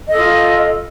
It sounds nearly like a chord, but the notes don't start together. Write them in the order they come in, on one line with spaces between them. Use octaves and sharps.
D#5 A4 F4